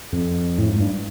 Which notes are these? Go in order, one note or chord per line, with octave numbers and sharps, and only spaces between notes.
F2
A2
G#2
G2